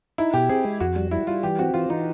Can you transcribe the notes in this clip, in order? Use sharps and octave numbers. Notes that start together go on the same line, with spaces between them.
D#4 E4
B2 G4
C4 G#4
G#3
F2 F#4
G3
G3 E4
G3 F4
E3 G4
C4 F#4
E3 F4
E3 D#4